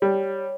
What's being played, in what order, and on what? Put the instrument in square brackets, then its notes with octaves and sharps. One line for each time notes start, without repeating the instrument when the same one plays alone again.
[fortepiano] G3 [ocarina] C#5